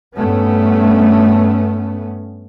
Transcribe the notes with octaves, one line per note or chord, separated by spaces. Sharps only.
G2 A3 B3 C#4